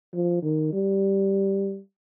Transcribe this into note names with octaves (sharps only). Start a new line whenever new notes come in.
F3
D#3
G3